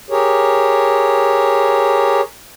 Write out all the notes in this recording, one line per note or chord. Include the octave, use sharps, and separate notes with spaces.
G4 G#4 A#4 C#5